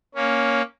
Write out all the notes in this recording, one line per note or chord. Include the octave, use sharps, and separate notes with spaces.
A#3 C#4